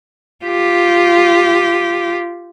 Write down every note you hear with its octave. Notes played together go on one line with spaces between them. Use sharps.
F4 G4